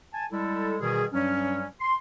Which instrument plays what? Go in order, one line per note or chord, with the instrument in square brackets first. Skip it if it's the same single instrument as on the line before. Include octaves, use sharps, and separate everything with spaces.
[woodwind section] G#5 A5
G3 G#3 E4 A4
B2 D#3 E3 G3 G#4
G2 F#3 G3 C#4
C6